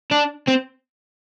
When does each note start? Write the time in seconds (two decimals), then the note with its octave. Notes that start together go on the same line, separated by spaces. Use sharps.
0.11 D4
0.48 C4